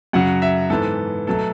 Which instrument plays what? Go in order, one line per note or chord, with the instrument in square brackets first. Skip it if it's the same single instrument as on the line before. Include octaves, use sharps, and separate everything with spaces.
[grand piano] F#2 C#3 F#3 F#5
E5
G#2 E3 B3 A4
B2 F#3 A3 A4